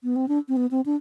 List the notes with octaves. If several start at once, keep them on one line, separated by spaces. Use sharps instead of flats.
B3
C4
D4
C4
B3
C4
D4